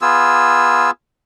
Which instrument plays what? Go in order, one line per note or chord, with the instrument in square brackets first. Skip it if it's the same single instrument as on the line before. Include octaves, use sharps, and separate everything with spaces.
[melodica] B3 F4 G#4 E6